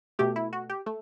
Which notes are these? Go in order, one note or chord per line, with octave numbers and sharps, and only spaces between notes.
B2 A3 G4
E4
F#4
G4
A3